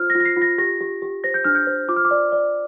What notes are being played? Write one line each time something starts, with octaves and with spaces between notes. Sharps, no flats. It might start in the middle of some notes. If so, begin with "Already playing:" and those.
Already playing: F4 C5 F6
A#6
F4
A#6
C7
F4
A#6
G4 A#6
G4
G4
C5 A#6
G6
D4 F6
G6
C5
F4 D6
F6
D6
D5
D5